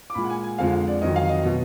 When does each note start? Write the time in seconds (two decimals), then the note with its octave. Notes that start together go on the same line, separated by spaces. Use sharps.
0.10 D6
0.14 A#2 G#3 B5
0.24 F#5
0.29 G#5
0.44 G#5
0.58 F2 D3 F3 G#3 F5
0.73 F5
0.87 D5
1.01 F2 D#3 F#3 D#5
1.16 F5
1.29 D#5
1.45 B2 F#3